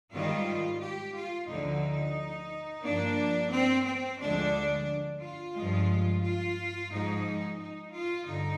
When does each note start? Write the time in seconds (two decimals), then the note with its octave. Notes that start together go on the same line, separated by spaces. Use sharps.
0.12 G#2 D#3 G3 F4
0.80 G4
1.15 F4
1.48 D2 D3 F3 D#4
2.84 G2 F3 A#3 D4
3.52 C4
3.86 C4
4.19 D2 D3 F3 G#3 D4
5.21 F4
5.55 G2 F3 G#3
6.23 F4
6.91 G#2 F3 G#3 D#4
7.59 D#4
7.93 F4
8.26 G2 D3 D#4